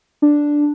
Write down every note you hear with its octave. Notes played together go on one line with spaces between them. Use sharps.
D4